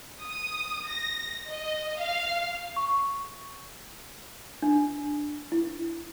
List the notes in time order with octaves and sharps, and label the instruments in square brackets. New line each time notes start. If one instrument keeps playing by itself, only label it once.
[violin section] D#6
A#6
D#5
F5
[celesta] C#6
[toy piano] D4
E4